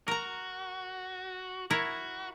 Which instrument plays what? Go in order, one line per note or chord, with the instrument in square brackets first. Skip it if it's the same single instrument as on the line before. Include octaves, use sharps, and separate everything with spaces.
[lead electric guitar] F#4 [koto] A#4 A#5
[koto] E4 A#4 C#5 [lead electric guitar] F#4